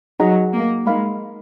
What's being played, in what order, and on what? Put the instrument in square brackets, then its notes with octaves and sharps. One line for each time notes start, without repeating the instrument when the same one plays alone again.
[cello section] F#3 [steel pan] D#4 G#4 D#5 F#5 A#5
[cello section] A#3
[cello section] G#3 [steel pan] D#4 A#4 F5 B5